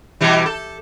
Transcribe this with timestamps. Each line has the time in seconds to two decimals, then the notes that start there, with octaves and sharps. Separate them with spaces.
0.21 B2 E3 G3
0.46 A4